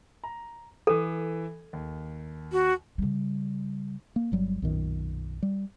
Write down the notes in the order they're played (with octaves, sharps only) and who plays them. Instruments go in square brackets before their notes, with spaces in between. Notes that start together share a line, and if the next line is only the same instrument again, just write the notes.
[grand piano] A#5
[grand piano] E3 D6 D#7 [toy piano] A4
[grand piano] D#2
[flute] F#4
[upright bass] C#3 G3
[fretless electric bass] A#3
G1 F#3 G3
B1 F#2 A#2 D#3
G3